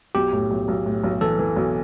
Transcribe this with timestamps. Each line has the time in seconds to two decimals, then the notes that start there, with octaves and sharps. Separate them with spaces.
0.15 B1 G4
0.33 A2
0.51 B1
0.68 B1
0.86 A2
1.03 B1
1.21 E3 A4
1.39 E3
1.56 B1